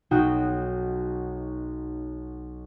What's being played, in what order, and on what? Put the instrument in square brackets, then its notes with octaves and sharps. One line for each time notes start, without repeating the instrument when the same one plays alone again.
[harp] B1 D#4 F#4 G5